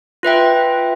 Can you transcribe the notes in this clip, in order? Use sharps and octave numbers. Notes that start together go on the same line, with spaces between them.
F4 B4 E5 G5